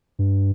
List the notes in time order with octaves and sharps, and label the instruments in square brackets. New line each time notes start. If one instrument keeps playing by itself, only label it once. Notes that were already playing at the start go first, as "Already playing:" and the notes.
[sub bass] G2